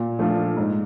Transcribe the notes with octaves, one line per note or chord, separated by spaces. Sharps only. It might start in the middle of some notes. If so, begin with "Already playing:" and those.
Already playing: A#2
F3 A3 D4 F4
G#2